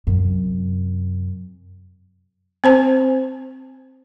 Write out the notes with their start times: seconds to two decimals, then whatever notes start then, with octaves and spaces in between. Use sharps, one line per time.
0.07 F#2 C3
2.64 C4 C5 A5